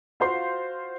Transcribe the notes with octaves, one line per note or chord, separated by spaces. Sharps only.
F4 F#4 C5 F5 C6